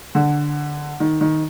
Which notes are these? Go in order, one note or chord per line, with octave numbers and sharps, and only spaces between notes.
D3
D#3
D#3